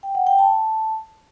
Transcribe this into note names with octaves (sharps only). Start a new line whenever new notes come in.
G5
F#5
G5
A5